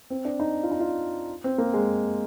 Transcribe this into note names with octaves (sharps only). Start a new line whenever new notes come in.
C4
D4
D#4
F4
D#4
F4
C4
A#3
G#3